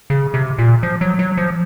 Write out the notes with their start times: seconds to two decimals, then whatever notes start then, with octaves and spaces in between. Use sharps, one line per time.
0.10 C#3
0.34 C3
0.59 A#2
0.83 F3
1.01 F#3
1.19 F#3
1.37 F3